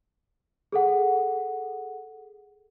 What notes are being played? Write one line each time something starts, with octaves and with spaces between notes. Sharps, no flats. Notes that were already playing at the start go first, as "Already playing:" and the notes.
G#4 A4 F#5